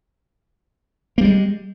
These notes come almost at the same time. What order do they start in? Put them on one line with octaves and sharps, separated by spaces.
A#3 G3 G#3